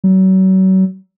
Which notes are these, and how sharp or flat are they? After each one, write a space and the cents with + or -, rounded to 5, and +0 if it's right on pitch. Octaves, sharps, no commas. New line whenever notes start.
F#3 +35